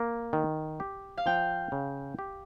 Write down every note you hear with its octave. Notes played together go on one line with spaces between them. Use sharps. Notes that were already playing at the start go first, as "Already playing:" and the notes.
Already playing: A#3
D#3
G4
F5
F3 G5
C#3
G4